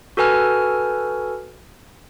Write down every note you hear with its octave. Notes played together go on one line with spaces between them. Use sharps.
F#4 A4 B4 G#5 F6